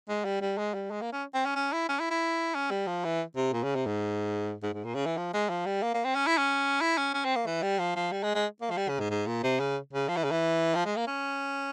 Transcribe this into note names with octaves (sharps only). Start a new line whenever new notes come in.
G#3
G3
G3
G#3
G3
G#3
A#3
C#4
C4
C#4
C#4
E4
C#4
E4
E4
C#4
G3
F3
E3
C3
A#2
C#3
C3
G#2
G#2
G#2
A#2
C#3
E3
F3
G#3
F3
G3
A#3
A#3
C4
C#4
E4
C#4
E4
C#4
C#4
C4
A#3
E3
G3
F3
F3
G3
G#3
G#3
A#3
F3
G3
C#3
G#2
G#2
A#2
C3
C#3
C#3
F3
E3
C#3
E3
F3
G#3
A#3
C#4